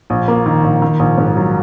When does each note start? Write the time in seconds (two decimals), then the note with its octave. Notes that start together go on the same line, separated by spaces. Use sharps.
0.10 A#1
0.28 A#3
0.46 D#3
0.64 A#1
0.82 D#3
0.99 A#1
1.18 G#2
1.36 F#3